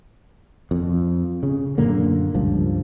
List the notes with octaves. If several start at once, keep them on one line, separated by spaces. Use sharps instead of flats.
F2
C#3
F#2 A#2 D3 A#3
C#2 G2 F3